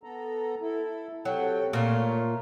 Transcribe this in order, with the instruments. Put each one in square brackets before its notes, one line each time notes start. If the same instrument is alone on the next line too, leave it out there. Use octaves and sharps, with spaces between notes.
[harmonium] B3 A4 A#5
E4 A4
[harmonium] C3 A4 G5 [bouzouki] F#3
[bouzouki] A#2 F4 [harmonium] A3 C#5